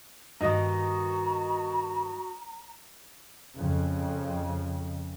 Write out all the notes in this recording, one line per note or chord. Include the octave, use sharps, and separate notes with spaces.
G2 D#3 D#4 F#4 D#5 A#5
F2 C#3